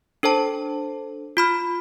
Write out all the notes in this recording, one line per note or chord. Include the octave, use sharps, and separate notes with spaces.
D4 A4 C5 A5
F4 B5 F6